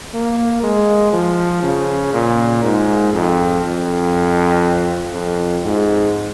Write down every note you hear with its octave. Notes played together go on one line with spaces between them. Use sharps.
A#3
G#3
F3
C#3
A#2
G#2
F2
F2
F2
G#2